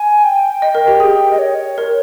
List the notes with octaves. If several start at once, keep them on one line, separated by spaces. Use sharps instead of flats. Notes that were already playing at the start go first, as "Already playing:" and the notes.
Already playing: G#5
G5
D#5
A#4
G4
G#4
D#5
C#5
A#4